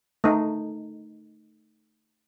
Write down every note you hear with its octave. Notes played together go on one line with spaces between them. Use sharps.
A3 D#4